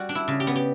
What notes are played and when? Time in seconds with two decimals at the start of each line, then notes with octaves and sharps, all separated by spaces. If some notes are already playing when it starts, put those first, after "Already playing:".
Already playing: G3 F#4
0.09 D4
0.15 E4
0.28 C#3
0.40 G4
0.47 B3
0.56 G4